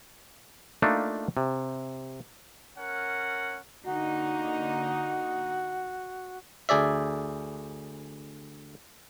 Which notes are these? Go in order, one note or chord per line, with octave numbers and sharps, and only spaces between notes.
A3 A#3 D4 D#4 F4
C3
C#4 A#4 F#5
D3 A#3 D#4 F#4
D2 G#4 D5 E5